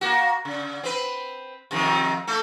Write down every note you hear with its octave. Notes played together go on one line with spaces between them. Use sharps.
A#3 F#4
C#3
C4 B4
F2 C3 D#3
A3 A4